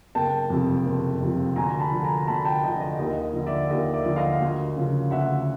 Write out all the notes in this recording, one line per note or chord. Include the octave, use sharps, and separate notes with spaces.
F#1 G5 A5
F2 C3 F3
F#1
F2 C3 F3
D2 G#5 A#5
A5 B5
D3 F3
G#5 A#5
D2 A5 B5
G5 A5
D3 F3 D#5
D#5
D#2 D#5
D#5
D3 F3
D5 E5
D#2 D#5
D5 E5
D3 F3
D#5 F5
D2
C#3 F3
D2 E5 F#5